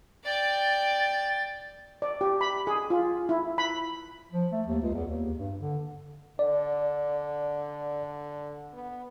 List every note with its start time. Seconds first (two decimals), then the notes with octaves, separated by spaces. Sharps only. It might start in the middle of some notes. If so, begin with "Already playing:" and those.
0.25 D5 G5 A6
2.02 D5
2.21 G4
2.41 B5
2.67 G#4
2.90 F4
3.29 E4
3.58 B5
4.33 F3
4.52 A3
4.67 D#2
4.82 C#2
4.94 E2
5.08 D#2
5.38 G2
5.60 D3
6.39 D3 D5
8.73 B3